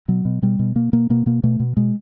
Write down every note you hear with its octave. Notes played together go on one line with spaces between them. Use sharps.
B2 F#3
B2
B2 G3
B2
B2 A#3
B2 A#3
B2 A#3
B2 A#3
B2 A3
B2
B2 G#3